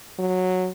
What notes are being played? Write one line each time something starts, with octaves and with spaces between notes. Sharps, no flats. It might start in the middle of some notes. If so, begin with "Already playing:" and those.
F#3